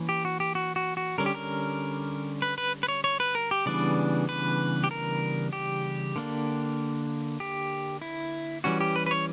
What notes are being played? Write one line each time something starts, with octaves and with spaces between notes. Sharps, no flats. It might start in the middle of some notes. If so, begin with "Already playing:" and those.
Already playing: E3 A#3 C#4
G4
F#4
G4
F#4
F#4
F#4
D3 G3 C#4 A#4
G4
A#4
B4
B4
B4
C#5
C#5
B4
A#4
G4
C#3 E3 G3 B3 D4 D5
B4
G4
A#4
G4
D3 A#3 D4
G4
E4
E3 G3 C#4 F#4
G4
B4
B4
C#5